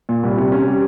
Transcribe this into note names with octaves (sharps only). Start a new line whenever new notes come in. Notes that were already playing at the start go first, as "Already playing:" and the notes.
A#2
C2
C3
C#4
G3